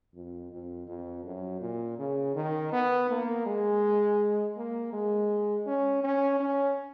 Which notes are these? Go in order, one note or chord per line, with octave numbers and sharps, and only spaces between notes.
F2
F2
F2
F#2
A#2
C#3
D#3
B3
A#3
G#3
A#3
G#3
C#4
C#4
C#4